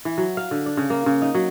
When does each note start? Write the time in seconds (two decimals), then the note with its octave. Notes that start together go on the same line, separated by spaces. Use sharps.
0.05 E3
0.18 F#3
0.37 F5
0.51 D3
0.66 D4
0.77 C#3
0.90 A#3
1.06 C#3
1.22 D#4
1.35 F#3